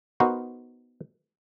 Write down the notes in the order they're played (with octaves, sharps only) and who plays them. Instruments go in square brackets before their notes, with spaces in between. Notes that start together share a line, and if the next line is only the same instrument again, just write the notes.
[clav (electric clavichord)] B3 D#4 F#4 A#4 C5